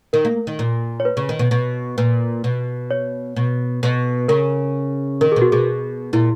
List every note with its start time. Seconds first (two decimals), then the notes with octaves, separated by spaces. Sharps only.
0.13 D#3 A#4
0.25 A#3
0.47 D#3
0.59 A#2
1.00 C#5
1.05 B4
1.17 C#3
1.29 D#3
1.39 B2
1.51 B2
1.98 A#2 B4
2.44 B2
2.91 C#5
3.36 B2
3.83 B2
4.28 C#3 A#4
5.21 D#3 A#4
5.32 B2 G#4
5.42 F#4
5.52 B2 G#4
6.13 A#2 E4